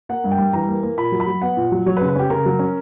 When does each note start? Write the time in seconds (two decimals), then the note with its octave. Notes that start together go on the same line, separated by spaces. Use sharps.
0.09 A#3 F#5
0.24 G2
0.32 G5
0.38 G3
0.53 E3 A#5
0.68 A#3
0.83 A#3
0.97 A#2 B5
1.12 F#3
1.20 B5
1.27 F#3
1.42 B3 F#5
1.57 A#2
1.72 F#3
1.86 F#3 C#5
1.97 B4
2.01 C#3
2.08 B4
2.16 C#4 G4
2.30 C#3 A#4
2.46 F#3
2.59 C#4